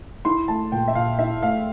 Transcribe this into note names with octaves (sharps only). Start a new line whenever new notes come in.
E4 C6
A3 A5
A#2 G5
E5
A#2 F5
E4 E5
A3 F5